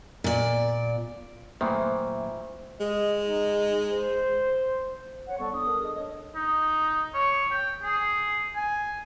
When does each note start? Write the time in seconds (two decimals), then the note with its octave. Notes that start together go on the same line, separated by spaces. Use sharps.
0.24 A#2 D5
1.61 F#2 A#2 D#3 E3 A3 C5 E5
2.80 G#3 D#5
3.27 D#4
3.92 C5
5.27 C#5 F#5
5.39 G3 B3 A4 D5 C#6
5.53 D4 D#6
5.66 D4 A4 A#4
5.81 G#4 D#5
5.96 D4 C#5 D#5
6.35 D#4
7.14 C#5
7.51 G5
7.84 G#4
8.56 G#5